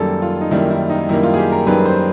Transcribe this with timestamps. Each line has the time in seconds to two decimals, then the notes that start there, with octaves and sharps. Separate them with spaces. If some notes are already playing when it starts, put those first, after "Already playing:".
Already playing: F#2 D#3 G3 A#3 A4
0.22 F4
0.41 D#4
0.51 F#2 D#3 G3 A#3 E4
0.70 E4
0.90 D#4
1.09 F#2 D#3 G3 A#3 E4
1.23 F4
1.34 G#4
1.38 G4
1.52 A#4
1.66 F#2 D#3 G3 A#3 B4
1.86 C5